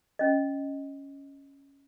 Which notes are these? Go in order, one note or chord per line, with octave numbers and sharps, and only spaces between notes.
C#4 D#5